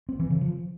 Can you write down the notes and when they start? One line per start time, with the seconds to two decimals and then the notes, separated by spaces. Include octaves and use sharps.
0.09 C4
0.20 E3
0.30 C#3
0.41 F3